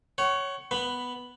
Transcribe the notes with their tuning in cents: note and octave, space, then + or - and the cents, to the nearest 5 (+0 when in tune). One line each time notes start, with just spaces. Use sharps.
C#5 +0 F#5 +35
B3 +0 B5 +10